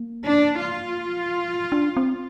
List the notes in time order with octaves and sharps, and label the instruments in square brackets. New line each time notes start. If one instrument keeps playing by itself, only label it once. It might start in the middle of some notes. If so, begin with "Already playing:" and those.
Already playing: [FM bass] A#3
[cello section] D4
F4
[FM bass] D4
C4